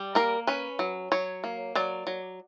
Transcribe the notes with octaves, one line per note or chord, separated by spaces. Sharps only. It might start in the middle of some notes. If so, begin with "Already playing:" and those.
Already playing: G3
A#3 A#4
C#4 B4
F#3
F#3 C#5
A#3
F#3 D5
F#3